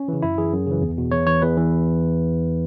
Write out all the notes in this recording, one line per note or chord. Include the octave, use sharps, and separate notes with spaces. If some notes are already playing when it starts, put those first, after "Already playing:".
Already playing: C#4
C#3 E3
F#2 E4
E3 G#4
F#2
C#3 E3
E2
B2
E2 C#5
E3 C#5
E2 B4
E3